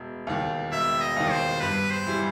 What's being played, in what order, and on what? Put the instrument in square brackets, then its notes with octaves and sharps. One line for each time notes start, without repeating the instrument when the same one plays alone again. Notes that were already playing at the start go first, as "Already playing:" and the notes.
Already playing: [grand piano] E1
D#2 D#3
[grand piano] E1 [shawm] E5
[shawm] D#5
[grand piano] D#2 D#3
[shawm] C5
[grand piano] G2 [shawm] B4
[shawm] C5
[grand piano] E3 G3